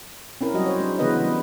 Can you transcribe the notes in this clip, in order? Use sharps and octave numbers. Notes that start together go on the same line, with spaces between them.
C4 C#4 E4 A#4
F#3 G3 F#4 D#5
C5 C#5
G#3 D4
C#3 E3 B3 E4 B4 D#5
G3